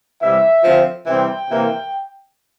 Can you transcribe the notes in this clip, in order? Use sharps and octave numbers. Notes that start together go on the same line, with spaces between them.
C3 E3 G3 E5
D3 F3 C4
C3 E3 G3 C4 G5
C3 E3 A#3